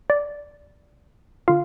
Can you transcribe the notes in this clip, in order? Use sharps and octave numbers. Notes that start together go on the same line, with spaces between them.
D5
D3 F4 F5